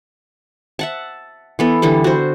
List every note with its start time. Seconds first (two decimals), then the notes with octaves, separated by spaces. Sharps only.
0.79 E5 F#5 A5
1.59 E3 B3 A4
1.82 D3 E3 G3 A4
2.04 F#4 C5